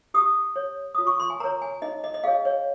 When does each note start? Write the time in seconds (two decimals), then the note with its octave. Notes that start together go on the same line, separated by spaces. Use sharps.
0.14 G4 D#6
0.56 C#5
0.95 F4 D#6
1.07 C#6
1.20 C6
1.30 G#5
1.40 A#4 C#5 A#5
1.62 G#5
1.82 D#4 D#5
2.04 D#5
2.14 D#5
2.24 G#4 C#5 F5
2.45 C#5